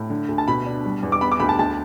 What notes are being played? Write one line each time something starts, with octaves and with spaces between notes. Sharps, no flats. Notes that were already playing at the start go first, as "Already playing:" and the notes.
Already playing: A2
D3
D2
A5
B2 B5
D4
G3
E2
D6
B3 B5
D6
D2 B5
A5
D2 A5